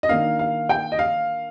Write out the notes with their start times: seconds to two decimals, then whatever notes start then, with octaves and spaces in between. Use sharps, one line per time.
0.03 D#5
0.09 D#3 A#3 D4 F5
0.39 F5
0.69 G5
0.92 D#5
0.99 F5